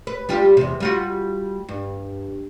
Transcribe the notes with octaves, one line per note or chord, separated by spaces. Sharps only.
B4
G3 F4 G4
E2 C3
G3 F4 F#4
G2